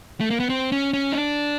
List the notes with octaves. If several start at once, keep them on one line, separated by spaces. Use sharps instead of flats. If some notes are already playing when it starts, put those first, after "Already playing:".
A3
A#3
B3
C4
C#4
C#4
D#4
D4